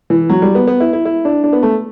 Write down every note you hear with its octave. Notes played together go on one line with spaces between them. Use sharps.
E3
F#3
G3
B3
B3
E4
E4
E4
D4
D4
B3
A3